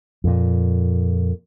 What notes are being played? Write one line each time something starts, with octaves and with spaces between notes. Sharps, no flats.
F2 A#2